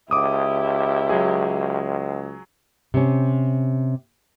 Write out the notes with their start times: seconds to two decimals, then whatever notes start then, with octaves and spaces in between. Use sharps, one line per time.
0.11 C#2 E4 G4 D6 D#6
1.10 F#3 G#4
2.94 C3 C#4